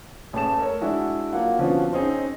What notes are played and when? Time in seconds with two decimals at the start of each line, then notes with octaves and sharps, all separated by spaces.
0.33 A1 A3 G#4 A5 E7
0.58 A4 A#4 C#5
0.81 G#3 D4 E4 F#4 G#4
1.33 F#3 A#3 F4 F#5
1.59 D3 F3 B3 C#4 F#4
1.92 C4 C#4 D#4 G#4